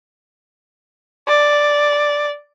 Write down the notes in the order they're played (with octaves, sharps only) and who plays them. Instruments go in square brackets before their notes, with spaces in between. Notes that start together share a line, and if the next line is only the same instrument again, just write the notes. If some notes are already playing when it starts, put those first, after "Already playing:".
[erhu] D5